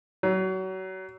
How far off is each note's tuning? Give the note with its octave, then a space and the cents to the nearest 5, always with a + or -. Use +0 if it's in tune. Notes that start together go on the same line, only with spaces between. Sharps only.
F#3 +30